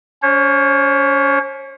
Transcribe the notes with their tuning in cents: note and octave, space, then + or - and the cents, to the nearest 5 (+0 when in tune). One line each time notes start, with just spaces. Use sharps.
C#4 +30 C#5 -45